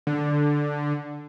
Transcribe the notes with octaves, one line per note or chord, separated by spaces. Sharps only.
D3